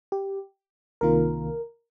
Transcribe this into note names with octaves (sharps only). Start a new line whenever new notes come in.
G4
C2 C3 D#3 A#3 F4 A#4